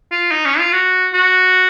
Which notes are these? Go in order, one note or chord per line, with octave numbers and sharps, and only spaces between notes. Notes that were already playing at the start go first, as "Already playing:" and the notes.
F4
D#4
C#4
F4
F#4
F#4